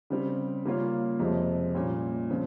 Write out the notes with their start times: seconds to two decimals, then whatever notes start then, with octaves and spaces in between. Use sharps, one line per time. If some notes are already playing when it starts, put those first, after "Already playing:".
0.10 C#3 G3 C4
0.65 C#3 G3 A#3 C#4 F4
1.19 F2 C3 F3 G#3
1.75 A#2 G3 C#4
2.30 C#3 F3 C4